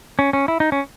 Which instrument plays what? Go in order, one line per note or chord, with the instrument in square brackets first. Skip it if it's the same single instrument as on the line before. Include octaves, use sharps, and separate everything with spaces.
[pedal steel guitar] C#4
C#4
E4
D#4
C#4